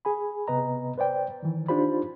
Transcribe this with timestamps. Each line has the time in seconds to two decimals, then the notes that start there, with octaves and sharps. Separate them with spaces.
0.05 G#4 G#5 B5
0.48 C3 B3 B4 D#5 A#5
0.98 B4 C5 D5 G5
1.43 D#3 E3
1.68 D4 D#4 F4 G4 C5 B5